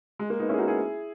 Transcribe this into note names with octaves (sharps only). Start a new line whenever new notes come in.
G#3
A#3
B3 D#4
C#4 E4
G#4
D#4 F#4
E4 G#4